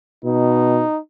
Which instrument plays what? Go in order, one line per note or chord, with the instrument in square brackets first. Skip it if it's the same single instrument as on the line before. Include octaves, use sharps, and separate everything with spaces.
[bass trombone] B2 [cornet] D#4